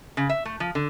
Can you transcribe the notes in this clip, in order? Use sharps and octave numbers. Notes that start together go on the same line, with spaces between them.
C#3
E5
A3
F3
D3